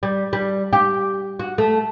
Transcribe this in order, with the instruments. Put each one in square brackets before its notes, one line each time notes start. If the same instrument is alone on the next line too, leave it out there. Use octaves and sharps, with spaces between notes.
[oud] G3
G3
G4
F#4
A3